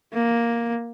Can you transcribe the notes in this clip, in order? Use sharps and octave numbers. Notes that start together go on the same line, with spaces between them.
A#3